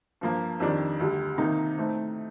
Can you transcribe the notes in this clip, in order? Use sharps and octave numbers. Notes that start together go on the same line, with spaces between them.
G2 F3 A#3
F2 D#3 G3 D4
D2 D3 G3
C3 D#3 A#3 D#4
A2 A3 C4 D#4